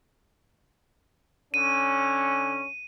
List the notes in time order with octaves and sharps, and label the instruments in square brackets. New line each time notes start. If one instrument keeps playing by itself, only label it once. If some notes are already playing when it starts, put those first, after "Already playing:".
[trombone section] D3 C#4 [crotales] D#7